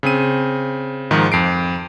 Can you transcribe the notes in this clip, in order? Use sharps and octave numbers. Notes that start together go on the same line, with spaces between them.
C#3 C4 D#7
G#2 D#3 F3
F2 C7 D7